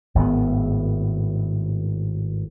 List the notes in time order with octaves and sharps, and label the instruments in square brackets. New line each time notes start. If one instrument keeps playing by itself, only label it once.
[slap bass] G#1 A2 C3 B3